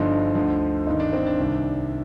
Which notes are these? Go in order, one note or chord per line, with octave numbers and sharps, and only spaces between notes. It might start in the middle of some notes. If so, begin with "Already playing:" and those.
Already playing: G1 G2 D3 F3 D#4
D2 D3 F3
G1 G2 D#3 D#4
D4
C4
D4
C2 C3 D#3